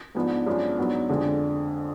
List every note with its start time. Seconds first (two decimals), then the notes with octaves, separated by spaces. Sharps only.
0.15 G#2 F3 B3 D4
0.46 F#2 F3 G#3 B3 D4
0.78 G#2 F#3 B3 D4
1.09 F2 D3 G#3 D4